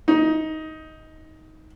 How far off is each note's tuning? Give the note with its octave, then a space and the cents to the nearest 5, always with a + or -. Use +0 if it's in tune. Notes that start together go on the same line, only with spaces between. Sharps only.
D#4 +15